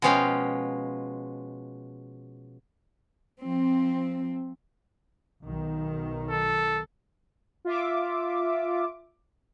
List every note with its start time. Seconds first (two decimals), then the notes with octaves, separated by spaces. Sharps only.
0.02 B2 F3 G#3 C#4 F5 G5
3.42 F3 C4
5.43 B1 D#3
6.29 A4
7.65 F4 E5 D6